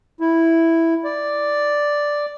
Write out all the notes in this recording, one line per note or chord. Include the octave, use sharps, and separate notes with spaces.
E4
D5